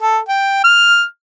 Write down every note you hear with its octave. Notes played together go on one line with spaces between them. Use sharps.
A4
G5
F6